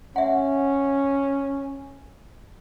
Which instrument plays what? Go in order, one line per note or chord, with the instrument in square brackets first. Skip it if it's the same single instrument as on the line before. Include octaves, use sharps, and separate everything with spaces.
[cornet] C#4 [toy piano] E5 F#5